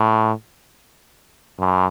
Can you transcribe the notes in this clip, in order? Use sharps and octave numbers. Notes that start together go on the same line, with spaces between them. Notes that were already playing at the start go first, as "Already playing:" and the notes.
Already playing: A2
F#2